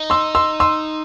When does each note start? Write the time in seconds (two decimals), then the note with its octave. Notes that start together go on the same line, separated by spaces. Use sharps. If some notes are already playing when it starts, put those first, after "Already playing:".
Already playing: D#4
0.10 C6 E6
0.35 C6 E6
0.60 C6 E6